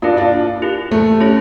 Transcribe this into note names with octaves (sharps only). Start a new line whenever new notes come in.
A#3 D4 E4 F4 A#4
D4 F4
E4 G4 A#4
A3
C#4 E4 G4 C#5